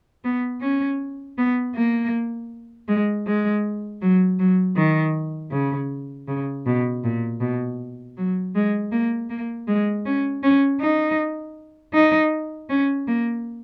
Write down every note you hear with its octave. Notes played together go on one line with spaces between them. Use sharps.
B3
C#4
B3
A#3
G#3
G#3
F#3
F#3
D#3
C#3
C#3
B2
A#2
B2
F#3
G#3
A#3
A#3
G#3
C#4
C#4
D#4
D#4
C#4
A#3